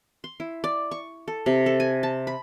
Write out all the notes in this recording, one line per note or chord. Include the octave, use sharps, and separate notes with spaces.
C6
E4
D5
C#6
A4
C3
A4
G#5
A5
B5